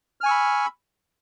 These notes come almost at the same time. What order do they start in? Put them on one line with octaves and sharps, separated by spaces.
F6 G#5 C#6 E6 B5